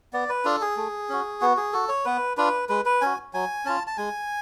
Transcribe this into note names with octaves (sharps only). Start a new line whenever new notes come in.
B3 D5
B4
D4 F4 A4
G#4
A3
C#4 F#4
B3 F#4
G#4
F#4 A4
C#5
B3 B4
D4 F4 B4
G#3 B4
B4
C#4 F#4 G#5
F#3 G#5
C#4 F4 A5
A5
G#3 G#5